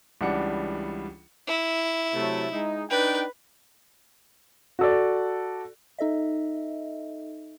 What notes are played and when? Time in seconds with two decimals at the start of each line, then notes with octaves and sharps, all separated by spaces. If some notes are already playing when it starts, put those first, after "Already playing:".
0.21 C#2 E3 G3 D4 F#5 C#7
1.48 E4
2.15 C3 F#3 A3
2.52 G#3 D#4
2.90 D4 D#4 B4 G5
4.79 F#4 A4 D5
5.99 D#4 A4 D#5 E5